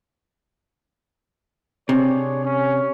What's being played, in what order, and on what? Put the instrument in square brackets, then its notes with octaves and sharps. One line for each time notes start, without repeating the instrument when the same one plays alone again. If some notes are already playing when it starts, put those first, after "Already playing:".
[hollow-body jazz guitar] C3 [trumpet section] D4 G#4 C#5
[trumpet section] C#4